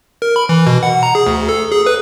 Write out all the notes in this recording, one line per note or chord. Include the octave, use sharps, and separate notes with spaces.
A#4
B5
E3
B2
F#5
A#5
G#4
D2
A4
G#4
B4